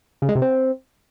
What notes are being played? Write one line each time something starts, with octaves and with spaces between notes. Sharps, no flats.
C#3
G#3
C3
C4